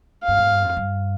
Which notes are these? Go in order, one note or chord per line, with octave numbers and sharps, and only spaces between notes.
F5
G2
G#2
G2
F2
G2